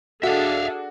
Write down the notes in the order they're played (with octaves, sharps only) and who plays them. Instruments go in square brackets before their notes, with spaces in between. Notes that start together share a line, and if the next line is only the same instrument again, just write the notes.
[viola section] D4 G#4 A4 [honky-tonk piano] F#4 [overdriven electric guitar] E5 F5